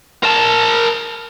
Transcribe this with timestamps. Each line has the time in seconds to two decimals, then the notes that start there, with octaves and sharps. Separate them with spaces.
0.23 A#4 A5